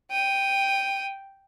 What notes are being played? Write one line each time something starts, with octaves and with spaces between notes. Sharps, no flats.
G5 D#7